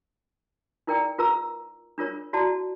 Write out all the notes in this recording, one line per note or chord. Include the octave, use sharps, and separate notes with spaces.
D#4 E4 A#4 D5 G5
F4 A#4 B4 A#5 E6
D4 F4 A#4 C#5
E4 F#4 D5 A5